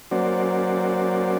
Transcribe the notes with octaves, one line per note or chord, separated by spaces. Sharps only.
F#3 A#3 C#4 F#4 C5 D5